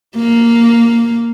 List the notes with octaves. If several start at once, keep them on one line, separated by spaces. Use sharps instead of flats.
A#3